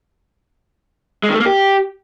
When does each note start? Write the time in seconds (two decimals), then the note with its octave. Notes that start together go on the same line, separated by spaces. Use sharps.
1.23 G#3
1.29 D#3
1.35 A3
1.40 A#3
1.46 G4